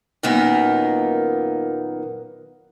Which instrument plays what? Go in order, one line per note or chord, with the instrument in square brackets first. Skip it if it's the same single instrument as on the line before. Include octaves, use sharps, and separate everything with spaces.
[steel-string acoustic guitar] F#2 A#2 D#3 A#3 B3 D#4